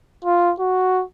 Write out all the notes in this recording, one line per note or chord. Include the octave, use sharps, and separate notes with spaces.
F4
F#4